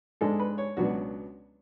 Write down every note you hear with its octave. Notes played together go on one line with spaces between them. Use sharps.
G#2 G#3 D4 A4
B4
C#5
C#2 B2 F#3 B3 D4 F#4